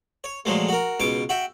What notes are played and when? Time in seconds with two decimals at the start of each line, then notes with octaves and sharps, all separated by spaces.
0.24 C#5
0.45 A#2 F3 F#3 G#3 A3
0.69 F#4 A#4
1.00 C#2 B2 C#6 D6
1.29 F#4 E5 G5